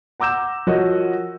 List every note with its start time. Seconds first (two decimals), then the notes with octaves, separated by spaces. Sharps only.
0.20 F#5 A#5 D6 E6 G6 E7
0.67 F3 F#4 A#4 C#5 D#5